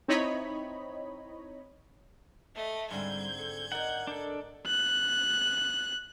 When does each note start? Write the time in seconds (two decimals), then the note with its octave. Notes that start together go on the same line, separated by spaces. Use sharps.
0.08 C4 D#4 E4 C#5 D#5 B5
2.55 A3 D#5 E5
2.90 G#2 D3 G3 C4 G6 G#6
3.38 A4
3.72 D#4 A#4 D5 F#5
4.07 D4 A4
4.67 F#6